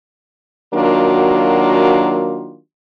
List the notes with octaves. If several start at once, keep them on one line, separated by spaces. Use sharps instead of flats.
D#3 F#3 A#3 D4 F4 F#4